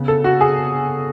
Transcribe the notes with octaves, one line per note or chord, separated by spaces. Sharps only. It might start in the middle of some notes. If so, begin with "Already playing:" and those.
Already playing: C#3 B3
A4
F#4
G#4